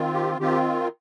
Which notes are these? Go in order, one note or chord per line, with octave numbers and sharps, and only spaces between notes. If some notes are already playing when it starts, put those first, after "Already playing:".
Already playing: D#3 C4 F4
G4
D#3 C4 F4 G4